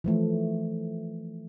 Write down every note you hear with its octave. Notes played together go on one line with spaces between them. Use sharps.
E3 F3 A3